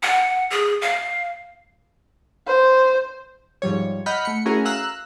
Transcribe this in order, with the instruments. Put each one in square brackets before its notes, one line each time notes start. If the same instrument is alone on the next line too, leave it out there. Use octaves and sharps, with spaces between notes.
[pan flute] F#5
G#4
F5
[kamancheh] C5
[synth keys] G#2 F3 G3 C#5
D#5 F#5 B5 F6 G6 B6
A3 C#7
A3 C#4 E4 F#4 G#4 A#4
F5 A#5 E6 F#6